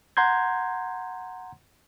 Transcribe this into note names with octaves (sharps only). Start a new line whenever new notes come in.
F#5 A#5 C6 G6 G#6